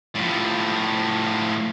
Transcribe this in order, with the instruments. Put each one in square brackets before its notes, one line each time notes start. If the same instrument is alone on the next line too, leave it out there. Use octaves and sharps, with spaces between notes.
[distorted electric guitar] A2 F3